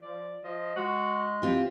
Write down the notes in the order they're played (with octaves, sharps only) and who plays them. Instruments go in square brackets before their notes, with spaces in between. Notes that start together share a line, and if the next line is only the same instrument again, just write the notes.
[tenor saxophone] F3 [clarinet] D5
[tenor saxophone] F3 [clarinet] D#5
[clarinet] G#3 [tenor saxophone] F#4
[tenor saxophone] E3 [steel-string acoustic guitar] C4 F4 G4